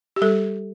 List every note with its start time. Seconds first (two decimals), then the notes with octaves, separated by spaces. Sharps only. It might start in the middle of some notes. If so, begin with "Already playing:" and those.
0.16 G4
0.22 G3 A4